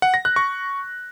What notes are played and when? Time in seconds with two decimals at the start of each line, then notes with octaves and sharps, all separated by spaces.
0.02 F#5
0.14 A#6
0.25 F#6
0.36 C#6